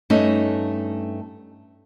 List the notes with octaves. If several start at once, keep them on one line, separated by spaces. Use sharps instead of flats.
G2 A3 C#4 D#4